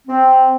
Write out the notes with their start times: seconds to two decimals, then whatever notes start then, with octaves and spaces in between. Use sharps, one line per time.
0.08 C4